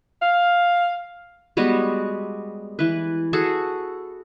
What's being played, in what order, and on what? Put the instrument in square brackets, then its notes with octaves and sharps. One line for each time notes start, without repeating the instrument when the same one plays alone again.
[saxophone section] F5
[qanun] G3 G#3 B3 F#4
E3 B4
F#4 G#4 A4